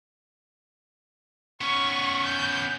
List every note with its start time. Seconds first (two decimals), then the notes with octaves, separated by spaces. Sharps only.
1.61 B3 C#4 C#6
2.26 G6